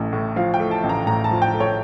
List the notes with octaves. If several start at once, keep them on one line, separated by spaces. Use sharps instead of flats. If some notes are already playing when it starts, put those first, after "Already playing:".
Already playing: A1 A3
A2
F3 F5
G5
A3
A5
A1
A#5
A2 A#5
A5
F3
G5
A3
C#5